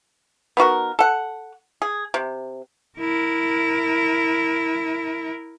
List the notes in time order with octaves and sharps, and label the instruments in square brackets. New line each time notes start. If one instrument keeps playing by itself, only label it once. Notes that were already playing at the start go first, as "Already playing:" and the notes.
[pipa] B3 D#4 F#4 A#4
A4 F#5
G#4
C3
[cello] E4 A#4